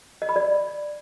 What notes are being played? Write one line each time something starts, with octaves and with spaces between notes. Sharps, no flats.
D#5
B5
D5